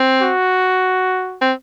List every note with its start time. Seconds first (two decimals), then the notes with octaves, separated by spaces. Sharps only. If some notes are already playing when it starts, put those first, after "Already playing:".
Already playing: C4
0.22 F#4
1.42 C4